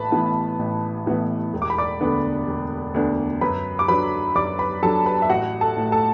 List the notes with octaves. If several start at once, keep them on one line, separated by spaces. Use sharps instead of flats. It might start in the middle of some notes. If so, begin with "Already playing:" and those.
Already playing: A1 B4 A5 B5
A2 E3 B3
A1
A2 E3 B3
E1
D6
B5
D5 D6
D2 D3 B3 D4
E1
D2 D3 B3 D4
F#2 B4 B5
D6
F#3 D4 B4 B5
F#2 D5 D6
B4 B5
F#3 D4 A4 A5
B4 B5
E5
A1 F#4 F#5
A4 A5
A2 A3
A4 A5